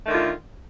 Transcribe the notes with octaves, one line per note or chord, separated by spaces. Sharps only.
D3 D#3 A3 F4